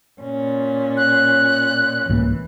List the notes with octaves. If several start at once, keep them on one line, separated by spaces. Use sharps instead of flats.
A#2 C#4
F#6
C2 G#2 E3 A#3